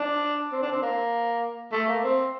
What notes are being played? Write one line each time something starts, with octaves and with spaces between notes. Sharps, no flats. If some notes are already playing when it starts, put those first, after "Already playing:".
Already playing: D4
C4
D4
C4
A#3
A3
A#3
C4